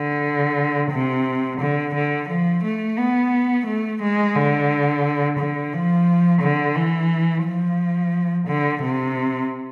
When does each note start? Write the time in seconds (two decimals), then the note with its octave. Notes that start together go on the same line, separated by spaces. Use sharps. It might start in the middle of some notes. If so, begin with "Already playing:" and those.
Already playing: D3
0.92 C3
1.60 D3
1.95 D3
2.29 F3
2.64 A3
2.98 B3
3.66 A3
4.02 G#3
4.35 D3
5.39 D3
5.73 F3
6.41 D3
6.76 E3
7.44 F3
8.48 D3
8.83 C3